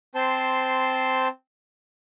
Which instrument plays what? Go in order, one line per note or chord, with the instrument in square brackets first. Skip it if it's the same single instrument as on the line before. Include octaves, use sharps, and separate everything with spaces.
[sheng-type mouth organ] C4 C5 A5 C6